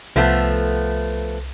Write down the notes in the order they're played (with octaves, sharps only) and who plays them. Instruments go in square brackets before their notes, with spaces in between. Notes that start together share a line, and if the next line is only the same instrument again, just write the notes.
[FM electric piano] C2 [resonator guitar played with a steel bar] F3 A3 B3